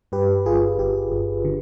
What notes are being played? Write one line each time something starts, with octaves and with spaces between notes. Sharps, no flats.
G2 G4 B4
G1 F4 G#4
G1 G4
G1
D3